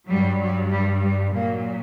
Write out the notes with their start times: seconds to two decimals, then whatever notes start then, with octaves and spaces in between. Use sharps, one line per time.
0.10 G2 F#3 G3
0.41 F#3
0.72 G3
1.03 G3
1.34 A#2 F#3 A#3